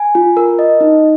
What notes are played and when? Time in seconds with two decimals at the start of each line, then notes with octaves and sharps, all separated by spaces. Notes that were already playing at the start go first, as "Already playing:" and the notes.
Already playing: G#5
0.15 F4
0.37 A#4
0.59 D#5
0.81 D#4